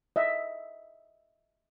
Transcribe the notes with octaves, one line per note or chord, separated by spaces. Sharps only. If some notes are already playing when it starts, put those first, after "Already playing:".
D#5 E5